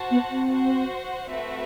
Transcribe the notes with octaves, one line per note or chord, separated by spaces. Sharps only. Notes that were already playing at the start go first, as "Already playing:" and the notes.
Already playing: F#4 C5 F#5 A5
B3
C4
F#4 C5 F#5
A3 C4 F#4 B4 E5